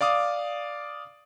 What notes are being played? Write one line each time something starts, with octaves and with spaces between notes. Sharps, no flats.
D5 F5 D6 D#6